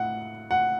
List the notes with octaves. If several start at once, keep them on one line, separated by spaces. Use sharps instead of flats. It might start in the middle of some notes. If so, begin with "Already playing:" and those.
Already playing: A2 F#5
F#5